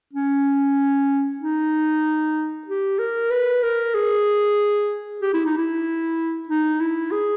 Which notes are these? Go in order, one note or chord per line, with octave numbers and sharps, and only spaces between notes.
C#4
D#4
G4
A#4
B4
A#4
G#4
G4
E4
D#4
E4
D#4
E4
G#4